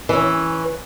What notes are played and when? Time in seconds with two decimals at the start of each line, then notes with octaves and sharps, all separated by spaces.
0.09 E3 C#4